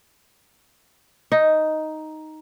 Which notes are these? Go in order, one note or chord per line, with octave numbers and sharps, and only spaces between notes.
D#4